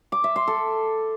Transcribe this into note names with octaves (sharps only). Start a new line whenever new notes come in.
D6
E5
C6
A4